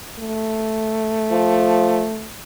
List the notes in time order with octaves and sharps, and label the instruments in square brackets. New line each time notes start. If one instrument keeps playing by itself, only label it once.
[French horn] A3
[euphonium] F3